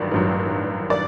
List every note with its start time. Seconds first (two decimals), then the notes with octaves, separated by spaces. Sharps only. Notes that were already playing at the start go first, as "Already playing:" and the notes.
Already playing: A1 G2 D#3 F#3 D5
0.12 A1 G2 D#3 F#3
0.90 D5